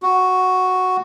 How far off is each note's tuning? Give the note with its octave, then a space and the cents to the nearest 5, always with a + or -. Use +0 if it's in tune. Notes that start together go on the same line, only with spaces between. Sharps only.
F#4 +0